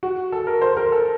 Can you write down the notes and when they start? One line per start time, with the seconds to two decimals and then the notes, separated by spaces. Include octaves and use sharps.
0.03 F#4
0.32 A4
0.47 A#4
0.62 C5
0.77 A#4
0.92 A4